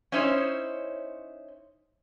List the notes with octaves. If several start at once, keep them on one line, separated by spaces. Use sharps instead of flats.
C#4 D#4 E4 C5 C#5